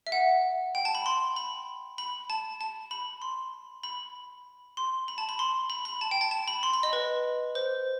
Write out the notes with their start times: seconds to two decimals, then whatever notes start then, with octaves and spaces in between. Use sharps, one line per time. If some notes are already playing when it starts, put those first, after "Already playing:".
0.07 E5
0.12 F#5
0.75 G5
0.85 A5
0.95 B5
1.06 C6
1.36 B5
1.98 B5
2.30 A5
2.61 A5
2.91 B5
3.22 C6
3.83 B5
4.77 C6
5.08 B5
5.18 A5
5.29 B5
5.39 C6
5.70 B5
5.85 B5
6.01 A5
6.11 G5
6.21 A5
6.31 A5
6.48 B5
6.63 C6
6.73 B5
6.83 D#5
6.93 B4
7.55 C5